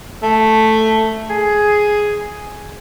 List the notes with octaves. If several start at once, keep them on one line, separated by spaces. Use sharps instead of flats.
A3
G#4